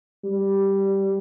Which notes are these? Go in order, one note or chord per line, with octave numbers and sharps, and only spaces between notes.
G3